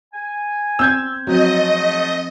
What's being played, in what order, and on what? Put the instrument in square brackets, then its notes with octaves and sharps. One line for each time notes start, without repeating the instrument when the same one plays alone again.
[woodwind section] G#5
[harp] C4 [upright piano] E6 G6 G#6
[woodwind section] G#2 A3 [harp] F3 C4 [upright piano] F#3 [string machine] D#5